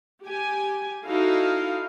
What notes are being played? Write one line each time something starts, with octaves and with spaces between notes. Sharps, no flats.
G4 G#5
D#4 E4 F#4 A4 F5